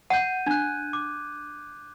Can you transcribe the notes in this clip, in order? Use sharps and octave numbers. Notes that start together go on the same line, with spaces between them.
F#5 G6 D#7
D4 F#6 G#6
D6